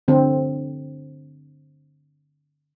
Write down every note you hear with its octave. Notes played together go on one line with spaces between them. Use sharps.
D3 C4